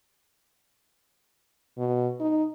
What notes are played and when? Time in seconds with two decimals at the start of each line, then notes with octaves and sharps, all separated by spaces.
1.78 B2
2.20 D#4